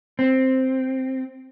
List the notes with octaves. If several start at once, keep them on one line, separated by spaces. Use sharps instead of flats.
C4